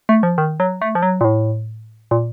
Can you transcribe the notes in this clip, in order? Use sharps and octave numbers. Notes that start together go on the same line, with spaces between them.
A3
F3
D#3
F#3
A3
F3
F#3
A#2
A2
A#2